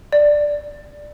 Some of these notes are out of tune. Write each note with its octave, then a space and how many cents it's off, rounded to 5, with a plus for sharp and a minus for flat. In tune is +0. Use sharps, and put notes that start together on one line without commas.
D5 +5